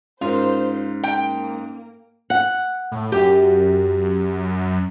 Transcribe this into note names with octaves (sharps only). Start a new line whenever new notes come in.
G#2 C#4 F4 A#4 C5
A#3 G5
F#5
A2
F#2 G4